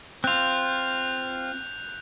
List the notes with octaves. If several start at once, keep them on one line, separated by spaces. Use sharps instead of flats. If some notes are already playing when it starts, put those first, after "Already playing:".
C4 F4 F#6 G6 F7